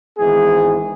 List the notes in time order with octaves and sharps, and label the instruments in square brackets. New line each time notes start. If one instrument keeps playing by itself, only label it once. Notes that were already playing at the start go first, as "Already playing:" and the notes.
[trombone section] G#1 G#2 E3 G#3 B3 G#4